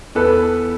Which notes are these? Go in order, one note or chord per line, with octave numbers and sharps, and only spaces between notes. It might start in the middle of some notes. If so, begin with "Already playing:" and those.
E2 A4 B4